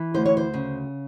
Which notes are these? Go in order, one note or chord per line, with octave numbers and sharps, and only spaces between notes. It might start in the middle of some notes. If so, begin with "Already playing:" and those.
Already playing: E3
D2 C5
C#5
C5
C#3